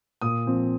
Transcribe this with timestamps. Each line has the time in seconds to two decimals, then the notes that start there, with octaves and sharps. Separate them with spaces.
0.21 A#2 D#6
0.47 F3 C4